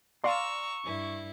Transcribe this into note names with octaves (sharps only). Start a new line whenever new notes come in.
D5 F5 A#5 C6 C#6 E6
G2 E4